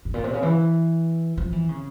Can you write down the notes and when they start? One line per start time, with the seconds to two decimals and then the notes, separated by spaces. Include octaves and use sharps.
0.05 G#2
0.14 A#2
0.24 C3
0.33 C#3
0.43 E3
1.37 F3
1.53 E3
1.69 C#3